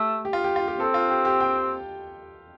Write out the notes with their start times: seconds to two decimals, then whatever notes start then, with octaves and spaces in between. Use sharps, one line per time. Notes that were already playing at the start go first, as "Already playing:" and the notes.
Already playing: A3 G4
0.25 G4
0.33 F4
0.44 G4
0.56 F4
0.68 G4
0.80 C4 A4
0.94 F4
1.10 G4
1.25 G4
1.40 G5